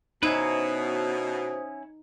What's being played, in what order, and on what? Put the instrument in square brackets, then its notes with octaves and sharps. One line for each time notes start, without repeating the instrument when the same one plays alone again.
[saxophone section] B2 [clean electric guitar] C#4 E4 B4 [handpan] D#4 [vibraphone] C5 D#6